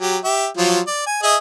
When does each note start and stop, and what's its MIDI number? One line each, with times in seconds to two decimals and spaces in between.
0.01 0.17 54
0.01 0.17 67
0.24 0.47 67
0.24 0.47 76
0.57 0.80 53
0.57 0.80 54
0.57 0.80 65
0.87 1.05 74
1.06 1.19 80
1.23 1.36 68
1.23 1.36 75
1.23 1.36 76